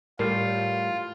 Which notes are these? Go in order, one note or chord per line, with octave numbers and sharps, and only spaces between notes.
A2 G3 F4 A#4 C7